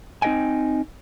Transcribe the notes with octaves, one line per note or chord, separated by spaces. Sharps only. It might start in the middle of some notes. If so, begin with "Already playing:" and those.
C4 D#4 B4 D#5 G5 G#5